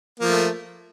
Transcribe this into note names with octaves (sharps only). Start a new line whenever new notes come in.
F3 A3 A#3